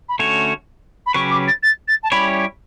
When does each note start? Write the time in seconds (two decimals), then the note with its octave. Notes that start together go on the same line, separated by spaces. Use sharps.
0.09 B5
0.19 D3 A3 C#4 F#4 C#5 C#6
1.06 B5
1.14 C#3 F#3 C#4 G4 B4 C#6
1.31 D6
1.47 A6
1.63 A6
1.88 A6
2.03 A5
2.11 G3 C#4 E4 G4 C#5 B5